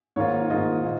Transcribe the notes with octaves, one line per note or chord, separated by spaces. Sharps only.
G#2 D#3 A#3 F4 C#5
G#2 D#3 A#3 F4 D#5
A#2